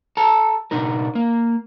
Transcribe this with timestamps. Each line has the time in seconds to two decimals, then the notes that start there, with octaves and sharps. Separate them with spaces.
0.17 A4 A5 A#5
0.71 B2 D4 D#4 A#4
1.15 A#3